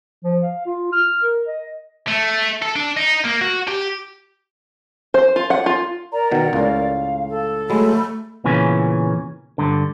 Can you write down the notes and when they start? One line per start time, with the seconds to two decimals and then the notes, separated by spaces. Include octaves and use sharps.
0.24 F3
0.43 F5
0.66 F4
0.92 F6
1.23 A#4
1.47 D#5
2.07 A3
2.62 A4
2.76 D4
2.97 D#4
3.25 A#3
3.41 F#4
3.68 G4
5.14 C5
5.36 F4
5.50 F#5
5.66 F4
6.12 A#4 D5 A#5
6.32 B2 D#3 F#5
6.53 C#2 A2 F5
7.30 A4
7.70 F#3 G#3 A3 B5
8.44 E2 A#2 C#3 E3 C#4
9.58 G2 D3